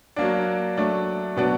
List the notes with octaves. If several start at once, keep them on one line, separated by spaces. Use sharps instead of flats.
F#3 A#3 D4
F#3 A3 D4
B2 F#3 B3 D4